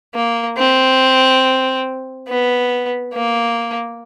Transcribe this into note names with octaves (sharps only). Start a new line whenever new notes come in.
A#3
C4
B3
A#3